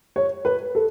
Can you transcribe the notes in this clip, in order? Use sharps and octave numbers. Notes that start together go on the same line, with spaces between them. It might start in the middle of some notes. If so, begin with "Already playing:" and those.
C#5
B4
A4